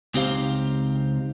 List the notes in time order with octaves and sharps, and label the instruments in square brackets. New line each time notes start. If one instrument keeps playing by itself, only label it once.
[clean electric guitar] C#2 C4 D#4 G4 C5 F5